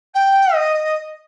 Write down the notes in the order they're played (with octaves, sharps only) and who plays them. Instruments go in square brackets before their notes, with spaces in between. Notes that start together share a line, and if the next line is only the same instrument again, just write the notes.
[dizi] G5
D#5